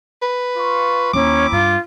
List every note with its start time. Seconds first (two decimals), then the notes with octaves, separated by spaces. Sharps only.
0.22 B4
0.57 F4 C#6
1.14 D#2 C4 C#4 E4 A#5 D6
1.52 G2 F4